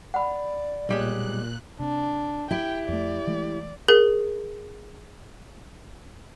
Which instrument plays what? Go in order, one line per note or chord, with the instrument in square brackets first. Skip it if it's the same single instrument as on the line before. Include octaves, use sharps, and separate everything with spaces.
[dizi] D5 [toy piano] F#5 B5
[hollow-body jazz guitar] B1 G3 G#3 [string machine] A#2 F#6
[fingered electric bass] C3 C4 [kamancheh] D4
[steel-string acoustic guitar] E4 G4 [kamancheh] G5
[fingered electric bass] F2 A3 [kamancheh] D5
[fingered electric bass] E3 G#3 A3
[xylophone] G#4 [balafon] A#4